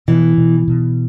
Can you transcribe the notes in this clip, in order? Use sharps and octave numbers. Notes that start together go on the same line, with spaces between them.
B2 E3
B2
B2